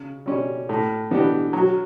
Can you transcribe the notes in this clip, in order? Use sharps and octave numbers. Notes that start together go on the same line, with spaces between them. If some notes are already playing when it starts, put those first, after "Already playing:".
Already playing: C#3
G3 C#4
A2
E3 B3 D4 G4
F#3